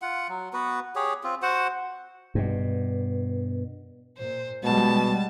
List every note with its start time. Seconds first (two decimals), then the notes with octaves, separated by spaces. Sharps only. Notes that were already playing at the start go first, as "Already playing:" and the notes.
0.02 F4 F#5
0.29 F#3
0.53 B3 F#4 B4
0.96 G4 G#4 C#5
1.24 C4 F4
1.42 F#4 C5 F#5
2.35 G2 B2
4.17 A#2 C5
4.64 B2 G3 G#3 A5